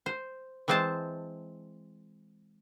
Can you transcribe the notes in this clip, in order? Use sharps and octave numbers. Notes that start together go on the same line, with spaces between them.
C5
E3 G#3 C4 C5 A5